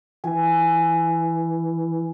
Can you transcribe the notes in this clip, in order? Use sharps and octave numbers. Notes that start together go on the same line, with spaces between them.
E3 G#5